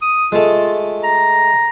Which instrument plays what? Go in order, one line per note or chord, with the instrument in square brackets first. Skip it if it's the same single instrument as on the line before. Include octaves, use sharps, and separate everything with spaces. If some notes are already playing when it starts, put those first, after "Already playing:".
[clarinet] D#6
[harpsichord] G#3 A3 [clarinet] F4
[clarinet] A#5